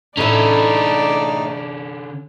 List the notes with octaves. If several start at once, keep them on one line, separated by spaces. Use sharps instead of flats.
A2 D3 C#4 D#4 D5 E5 A5